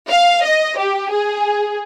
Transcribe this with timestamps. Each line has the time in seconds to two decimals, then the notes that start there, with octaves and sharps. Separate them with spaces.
0.10 F5
0.44 D#5
0.79 G4
1.11 G#4